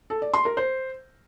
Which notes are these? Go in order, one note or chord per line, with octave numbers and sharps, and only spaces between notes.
A4
D5
C6
A#4
C5